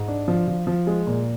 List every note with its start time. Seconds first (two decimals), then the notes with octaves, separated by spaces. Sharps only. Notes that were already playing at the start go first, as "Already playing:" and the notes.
Already playing: G#2
0.08 D4
0.28 F3
0.48 F3
0.67 F3
0.87 G#3
1.07 A#2